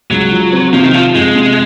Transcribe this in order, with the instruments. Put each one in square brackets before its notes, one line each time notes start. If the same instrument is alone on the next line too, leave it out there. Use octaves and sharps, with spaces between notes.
[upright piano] C#2 [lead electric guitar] F#3
[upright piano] F3
C4
[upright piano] C3 [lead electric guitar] F3
[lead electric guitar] D#3
[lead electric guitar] F3 [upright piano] F4
[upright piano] F2 [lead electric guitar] G#3
[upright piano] C3